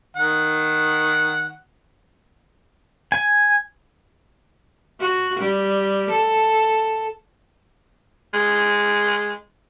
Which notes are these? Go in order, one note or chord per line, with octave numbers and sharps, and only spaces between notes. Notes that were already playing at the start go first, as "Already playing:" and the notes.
D#3 F#5
G#5
F#4
G3
A4
G#3